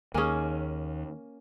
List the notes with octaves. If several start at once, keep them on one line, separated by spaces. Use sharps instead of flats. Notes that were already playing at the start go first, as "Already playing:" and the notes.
D#2 A#3 C#4 G#4 G#5